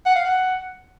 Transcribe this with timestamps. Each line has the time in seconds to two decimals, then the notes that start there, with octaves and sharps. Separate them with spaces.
0.06 F#5
0.15 F5
0.25 F#5